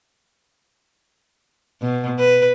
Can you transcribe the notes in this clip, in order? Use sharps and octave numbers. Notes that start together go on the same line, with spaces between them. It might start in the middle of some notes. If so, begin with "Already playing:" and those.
B2
B4